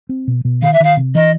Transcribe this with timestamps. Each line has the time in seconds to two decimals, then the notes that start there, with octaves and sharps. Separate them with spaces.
0.09 C4
0.28 B2
0.45 B2
0.62 D#3 F5
0.73 E5
0.80 D#3 F5
0.97 C3
1.15 E3 D#5